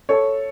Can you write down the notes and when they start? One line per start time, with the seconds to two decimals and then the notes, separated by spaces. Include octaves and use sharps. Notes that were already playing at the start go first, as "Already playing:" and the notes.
0.09 A4 C#5